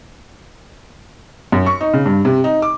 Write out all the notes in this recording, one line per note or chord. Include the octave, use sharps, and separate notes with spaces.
F#2
C#6
D#4
C#3
G2
C3
D#4
D6